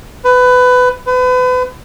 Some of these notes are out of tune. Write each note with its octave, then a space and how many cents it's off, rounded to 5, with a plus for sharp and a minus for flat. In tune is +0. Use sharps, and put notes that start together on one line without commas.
B4 +20
B4 +35